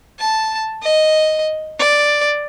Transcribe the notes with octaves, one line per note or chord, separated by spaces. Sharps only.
A5
D#5
D5